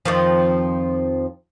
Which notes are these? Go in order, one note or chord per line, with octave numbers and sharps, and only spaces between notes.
F2 D#3 F3